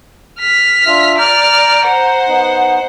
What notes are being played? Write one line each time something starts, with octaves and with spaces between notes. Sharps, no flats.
F6 B6
D4 F4 E5
D5 A#5 F6 G6
C5 F#5
B3 D#4